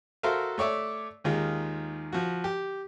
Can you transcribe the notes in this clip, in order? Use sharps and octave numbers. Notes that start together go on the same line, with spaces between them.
F#4 A4 A#4 C5 E5 F5
A3 C#5 D5 E5
D#2 D#3 G#3 F4
F3 F#4
G4